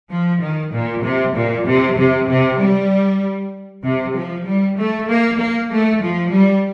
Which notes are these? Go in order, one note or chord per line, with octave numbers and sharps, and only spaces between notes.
F3
D#3
A#2
C3
A#2
C3
C3
C3
G3
C3
F3
G3
A3
A#3
A#3
A3
F3
G3